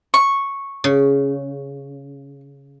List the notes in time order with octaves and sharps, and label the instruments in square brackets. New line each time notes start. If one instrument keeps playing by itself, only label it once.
[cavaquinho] C#6
[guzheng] C#3